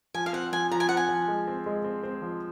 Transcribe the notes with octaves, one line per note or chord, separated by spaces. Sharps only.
F3 G#5
F5
C4 F#5
F3 G#5
F3 A#5
G#5
C4 F#5
G#5
F3
G#3
C4
G#3
C4
C4
F3